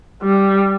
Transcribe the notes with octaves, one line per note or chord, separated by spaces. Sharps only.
G3